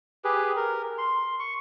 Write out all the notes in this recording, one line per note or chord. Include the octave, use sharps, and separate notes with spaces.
G4 G#4 B4
A#4
C6
C#6